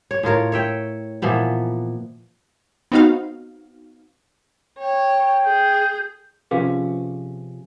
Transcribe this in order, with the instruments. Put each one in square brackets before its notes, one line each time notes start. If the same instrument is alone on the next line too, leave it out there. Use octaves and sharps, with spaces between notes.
[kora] C#5
A2 F4 A#4 C#5
C#5 E5 G5
A#2 E3 F3 B3
[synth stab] B3 C4 D#4 F#4 F5
[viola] C#5 [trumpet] G5
[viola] G#4 [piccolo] G6
[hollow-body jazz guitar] C3 F3 C#4 [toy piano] G#4 B4 F5